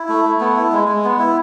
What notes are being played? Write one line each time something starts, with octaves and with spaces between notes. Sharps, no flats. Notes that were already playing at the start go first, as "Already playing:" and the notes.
Already playing: E4
A3
A3
B3
E4
G#3
G#3
B3
E4